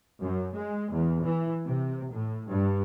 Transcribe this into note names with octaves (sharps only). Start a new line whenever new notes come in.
F#2
G#3
E2
E3
C3
A2
G2